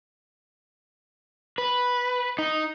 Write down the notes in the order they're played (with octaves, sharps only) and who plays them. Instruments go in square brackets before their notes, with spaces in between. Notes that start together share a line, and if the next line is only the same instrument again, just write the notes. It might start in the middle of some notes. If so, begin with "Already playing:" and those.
[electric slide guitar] B4
D#4